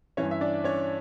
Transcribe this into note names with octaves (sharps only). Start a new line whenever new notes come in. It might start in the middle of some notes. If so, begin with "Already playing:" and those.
G2 E3 C#4 C#5
E5
D4 D5
C#4 C#5